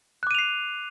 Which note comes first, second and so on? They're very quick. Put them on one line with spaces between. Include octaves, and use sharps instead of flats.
F#6 D6 D#7 F7 C7